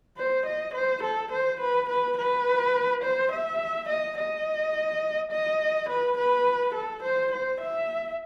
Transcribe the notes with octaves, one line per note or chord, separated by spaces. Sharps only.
C5
D#5
C5
A4
C5
B4
B4
B4
C5
E5
D#5
D#5
D#5
B4
B4
A4
C5
C5
E5